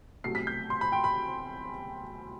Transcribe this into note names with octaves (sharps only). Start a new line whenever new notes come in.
C2 B2 F#3 A3 C7
B6
G6
C6
B5
G5
B5